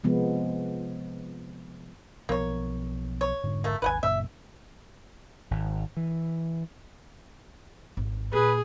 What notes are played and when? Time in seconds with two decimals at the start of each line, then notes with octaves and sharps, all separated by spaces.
0.04 C3 F3 G#3 B3
2.29 B1 F3 A#3 B3 C#5
3.21 C#5
3.43 F1 G#2 D3
3.64 A3 A#3
3.82 G#1 D#2 B4 F#5 G#5
4.03 F#1 F#2 A#2 E5
5.51 G#1
5.97 E3
7.97 G#1
8.33 A#2 G#4 B4